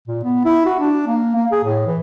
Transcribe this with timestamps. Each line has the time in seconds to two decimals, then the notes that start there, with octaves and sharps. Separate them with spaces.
0.08 A#2
0.24 B3
0.45 E4
0.66 F#4
0.79 D4
1.07 A#3
1.36 A#3
1.52 G#4
1.65 A2
1.87 E3